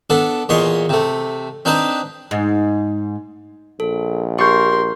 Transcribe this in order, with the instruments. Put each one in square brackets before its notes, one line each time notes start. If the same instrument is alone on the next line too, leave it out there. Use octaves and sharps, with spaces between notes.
[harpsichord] B3 D4 A4
E2 A#2 C#5 D#5 C6
C3 A3
C4 D4 D#4 B4 C5
[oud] G#2
[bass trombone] A#1 [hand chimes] A4
[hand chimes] G4 [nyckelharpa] A#4 C6 [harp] C#6 G6